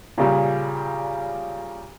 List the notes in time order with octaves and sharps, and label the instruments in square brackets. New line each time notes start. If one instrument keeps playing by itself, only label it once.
[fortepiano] A#2 C#3 G3